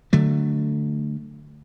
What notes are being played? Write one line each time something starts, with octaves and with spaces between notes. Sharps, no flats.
D3 F#3 A3